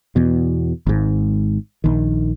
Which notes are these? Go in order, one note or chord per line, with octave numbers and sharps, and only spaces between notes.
E2 B2
G#1 G#2
A#1 D#3